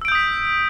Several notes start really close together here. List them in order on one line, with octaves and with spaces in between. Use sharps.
E6 D7 G6 D#6 B6